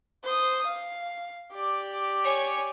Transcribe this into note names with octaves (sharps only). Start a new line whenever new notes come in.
C5 D#6
F5
G4 D5
C#5 G#5